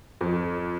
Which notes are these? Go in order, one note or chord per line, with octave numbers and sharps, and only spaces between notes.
F2